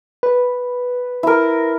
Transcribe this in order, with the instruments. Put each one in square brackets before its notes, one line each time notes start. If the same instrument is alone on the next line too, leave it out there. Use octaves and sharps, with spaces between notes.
[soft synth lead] B4
[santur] E4 A#4